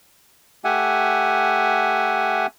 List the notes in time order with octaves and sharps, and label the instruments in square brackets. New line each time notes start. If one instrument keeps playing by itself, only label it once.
[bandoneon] A3 G4 E5 F#5 G#5